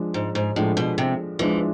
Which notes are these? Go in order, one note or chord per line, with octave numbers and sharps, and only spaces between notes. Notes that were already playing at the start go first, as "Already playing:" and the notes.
Already playing: F3 G#3 D4
G#2
G#2
A2 F3 G#3 D4
B2
C3
E3 F3 G#3 D4